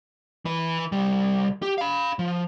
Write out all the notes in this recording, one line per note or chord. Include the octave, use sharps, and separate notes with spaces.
E3 B4
C2 G3
G4
F5 B5
F3